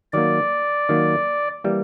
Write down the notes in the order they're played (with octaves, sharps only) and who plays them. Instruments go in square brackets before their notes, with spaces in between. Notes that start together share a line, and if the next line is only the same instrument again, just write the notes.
[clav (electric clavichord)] D#3 F#3 A#3 [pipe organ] D5
[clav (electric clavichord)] D#3 F#3 A#3
E3 G3 A#3